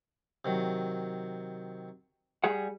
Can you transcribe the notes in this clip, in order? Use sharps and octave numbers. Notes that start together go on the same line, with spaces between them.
C3 D#3 F#3
G3 G#4 F#5